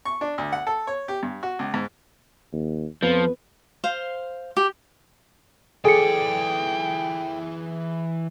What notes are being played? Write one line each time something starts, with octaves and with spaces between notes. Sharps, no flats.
C#6
D4
D2
F#5
A4
C#5
G4
G2
F#4
C#2
G#2
D#2
F2 F3 B3
C5 F5 C6
G4
E3 G#4 A4 D5 G5 C#7